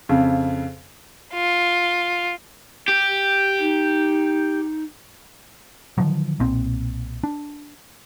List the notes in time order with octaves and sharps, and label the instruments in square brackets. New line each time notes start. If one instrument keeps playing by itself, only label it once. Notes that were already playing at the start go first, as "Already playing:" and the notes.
[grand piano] F2 C#3
[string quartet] F4
[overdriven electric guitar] G4
[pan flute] D#4
[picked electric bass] D3 D#3 F3 F#3
B1 A#2 C4
D4